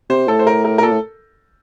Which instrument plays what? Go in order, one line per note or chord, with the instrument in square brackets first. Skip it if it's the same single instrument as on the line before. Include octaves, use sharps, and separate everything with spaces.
[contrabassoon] C3 [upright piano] C5
[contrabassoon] A2 [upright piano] A4
[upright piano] C5
A#4
A#4
A#4
[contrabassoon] A#2 [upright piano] A4
[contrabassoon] A2